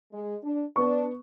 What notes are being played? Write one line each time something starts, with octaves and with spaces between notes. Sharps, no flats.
G#3
D4
B3 D4 C#6